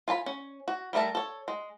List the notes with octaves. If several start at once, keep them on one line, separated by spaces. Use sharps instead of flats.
F4 G#5 A5 B5
C#4
F#4
G3 A3 A#4 E5 A5
A4 C#5
G#3